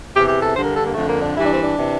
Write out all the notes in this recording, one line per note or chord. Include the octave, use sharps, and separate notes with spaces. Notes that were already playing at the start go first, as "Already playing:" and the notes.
E2 C3 E3 G4
G4
A4
G2 D3 C5
A#4
A4
A#3
F2 D3 A3
A#3
D4
G2 E3 E4
D4
C4
D4
C3 E3